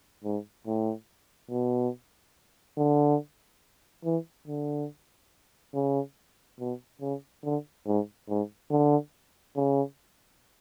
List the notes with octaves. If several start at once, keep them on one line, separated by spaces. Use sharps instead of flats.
G#2
A2
B2
D3
E3
D3
C#3
B2
C#3
D3
G#2
G#2
D3
C#3